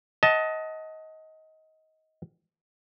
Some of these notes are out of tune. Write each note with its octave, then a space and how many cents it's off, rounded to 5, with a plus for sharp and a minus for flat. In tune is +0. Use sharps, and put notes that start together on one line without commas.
D#5 +20 F#5 +0 A5 +0